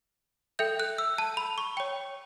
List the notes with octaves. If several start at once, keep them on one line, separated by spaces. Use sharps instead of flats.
A4 E5 G5 G6
F#6
E6
A5
B5
C#6
C#5 G5